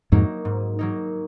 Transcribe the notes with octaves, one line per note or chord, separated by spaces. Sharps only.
F2 G#2 F#3 A#3 D#4
G#2
F#3 A#3 D#4